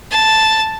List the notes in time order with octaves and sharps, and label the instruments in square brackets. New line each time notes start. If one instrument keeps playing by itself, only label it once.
[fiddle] A5